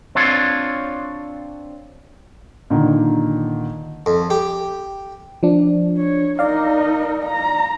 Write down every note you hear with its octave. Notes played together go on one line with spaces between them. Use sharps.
C4 D4 F4 C#5
A#2 D3 D#3
F2
G4
F3 D4
C#5
D#4 A#4 D5 F5
A#5